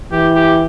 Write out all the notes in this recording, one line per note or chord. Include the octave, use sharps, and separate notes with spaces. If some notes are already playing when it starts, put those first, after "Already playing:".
E3 G4
G4